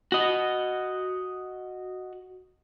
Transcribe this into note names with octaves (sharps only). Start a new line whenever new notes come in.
F#4 D#5